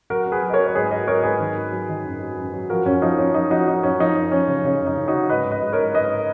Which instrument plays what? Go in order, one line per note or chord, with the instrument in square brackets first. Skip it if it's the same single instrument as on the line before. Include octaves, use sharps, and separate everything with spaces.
[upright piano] F#3 F#4 A#4
F#3
G#4 B4
F#3
D#5
A#4 C#5
F#3
C#5
G#2 G#4 B4
F#3 B4 D#5
F#3 A#4 C#5
G#2 G#4 B4
D#3
F#3
F#3
D#3
F#2
F#3
F#2
F#3
F3 F#4 A#4
F#2 C#4
F3 D#4
F#2 C#4
F3 D#4
F3 D#4 F#4
F3 D#4
F#2 C#4
F3 D#4
F#2
F3 C#4
C#3
C#3 C#4
F#2
D#4
C#3
D#4 F#4
C#3
G#2 B4 D#5
G#2
B4 D#5
G#2
A#4 C#5
G#2
G#2 B4 D#5